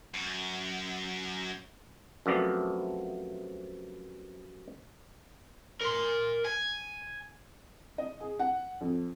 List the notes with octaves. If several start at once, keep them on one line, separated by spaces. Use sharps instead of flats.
F#2
F#2 C3 F3 A3 B3 D5
A#4 C6
G#5
D#5
G#4
F#5
F2